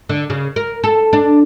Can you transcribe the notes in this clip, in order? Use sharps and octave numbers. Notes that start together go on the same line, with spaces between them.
D3
C#3
A#4
A4
D4